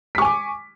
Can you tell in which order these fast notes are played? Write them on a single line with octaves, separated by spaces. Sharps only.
B6 C#6 G#5 D6